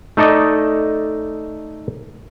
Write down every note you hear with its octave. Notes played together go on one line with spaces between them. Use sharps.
A3 D#4 A4 D5 D#5